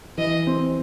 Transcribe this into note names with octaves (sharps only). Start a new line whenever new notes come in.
E3 D#5
C4